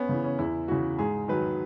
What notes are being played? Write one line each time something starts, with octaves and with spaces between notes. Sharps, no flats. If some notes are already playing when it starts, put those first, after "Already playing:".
Already playing: B3 C#4
C#3 E3
C#4
E2 E4
C#3 E3 F#4
G#2 G#4
D#3 F#3 B4